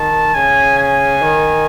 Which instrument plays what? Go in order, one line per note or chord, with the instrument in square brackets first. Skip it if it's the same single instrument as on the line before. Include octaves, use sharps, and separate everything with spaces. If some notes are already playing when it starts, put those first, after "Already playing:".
Already playing: [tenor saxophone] D#3 [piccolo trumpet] A5
[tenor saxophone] C#3 [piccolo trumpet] G#5
[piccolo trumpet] G#5
[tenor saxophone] D#3